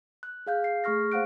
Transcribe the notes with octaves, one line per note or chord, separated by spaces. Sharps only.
F#6
G#4 F5 G6
C7
A3 G#4 C#6 F6 A#6
A#3 C5 F5 F#5 F#6 D7